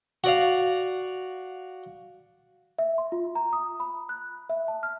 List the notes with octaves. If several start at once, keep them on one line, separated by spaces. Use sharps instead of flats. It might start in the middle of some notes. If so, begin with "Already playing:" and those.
F#4 D5 F5
E5
C6
F4
A#5
D#6
B5
F#6
E5
A5
F6